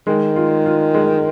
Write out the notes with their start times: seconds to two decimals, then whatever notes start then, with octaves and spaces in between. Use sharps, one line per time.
0.07 D#3 G#3
0.36 F4
0.66 F4
0.94 G#3